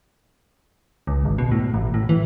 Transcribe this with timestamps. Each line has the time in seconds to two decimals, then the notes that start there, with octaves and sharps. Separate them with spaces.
1.07 C#2
1.25 G#1
1.38 B2
1.52 A2
1.74 A1
1.94 A2
2.09 E3